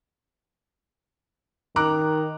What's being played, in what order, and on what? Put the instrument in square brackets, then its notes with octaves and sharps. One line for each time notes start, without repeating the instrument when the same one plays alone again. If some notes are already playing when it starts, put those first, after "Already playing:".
[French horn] D#3 [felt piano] A#5 D6 F#6